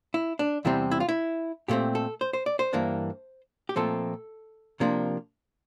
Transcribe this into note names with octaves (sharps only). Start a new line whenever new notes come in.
E4
D4
E2 C3 G3 C4 E4
E4
F4
E4
A#2 A3 C4 G4
A4
C5
C5
D5
C5
G2 E3 A#3 D4
G4
A#2 F3 A3 C4 A4
C3 F3 A#3 D4